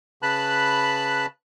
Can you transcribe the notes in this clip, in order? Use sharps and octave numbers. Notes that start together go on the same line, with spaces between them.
C#3 B4 A5 B5 F#6